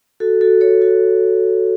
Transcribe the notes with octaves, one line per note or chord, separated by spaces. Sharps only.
F#4 A4
F#4 A4
A4 C#5
F#4 A4